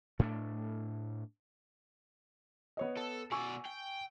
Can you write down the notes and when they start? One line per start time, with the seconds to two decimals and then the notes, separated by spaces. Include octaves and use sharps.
0.19 A2 A3 C#4 D4
2.77 B3 C#5 D#5
2.97 A4
3.32 B2 D5 G#5 C#6 E6
3.66 G5